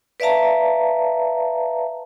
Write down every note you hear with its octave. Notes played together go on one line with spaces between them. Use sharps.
B4 D5 E5 F5 A5 A#5